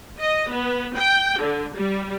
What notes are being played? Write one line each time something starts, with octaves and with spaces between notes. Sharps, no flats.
D#5
B3
G5
D3
G3